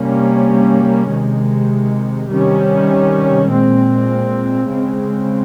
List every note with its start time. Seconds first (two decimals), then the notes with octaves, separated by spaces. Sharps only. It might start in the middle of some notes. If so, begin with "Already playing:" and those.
Already playing: C3 G3 A#3 C#4
1.09 C3 D#3 G#3
2.29 C3 D#3 G3 C#4
3.49 A#2 G#3 C4
4.69 C#3 G#3 C4